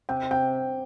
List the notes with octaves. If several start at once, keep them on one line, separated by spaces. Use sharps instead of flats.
C3 G5
C3 G5